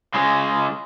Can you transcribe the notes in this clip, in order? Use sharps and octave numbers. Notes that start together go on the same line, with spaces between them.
C#3 G#3